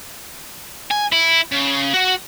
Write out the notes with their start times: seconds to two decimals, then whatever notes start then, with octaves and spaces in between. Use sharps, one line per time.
0.91 G#5
1.12 E4
1.52 C#3
1.94 F#4